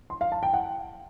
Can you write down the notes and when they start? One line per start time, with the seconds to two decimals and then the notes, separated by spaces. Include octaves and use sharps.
0.10 C6
0.21 F5
0.32 A5
0.43 G5
0.54 F#5